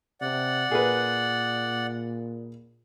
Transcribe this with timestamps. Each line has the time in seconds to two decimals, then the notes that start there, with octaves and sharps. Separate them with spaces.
0.21 C3 D5 F#5
0.71 A#2 G#4 A#4 B4